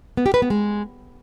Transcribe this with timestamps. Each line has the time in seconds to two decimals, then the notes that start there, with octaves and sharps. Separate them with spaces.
0.17 B3
0.26 G4
0.34 B4
0.42 B3
0.50 G#3